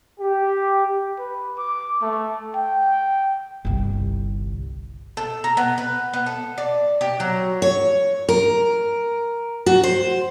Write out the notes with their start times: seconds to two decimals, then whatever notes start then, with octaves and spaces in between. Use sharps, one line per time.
0.19 G4
1.19 B4
1.58 D6
2.02 A3
2.55 G5
3.65 G1 C2
5.17 A4
5.44 A#5
5.57 B3
5.78 B4
6.13 B3
6.26 A4
6.58 D5
7.01 G4
7.20 F#3
7.62 C#5
8.29 A#4
9.66 F#4
9.83 C5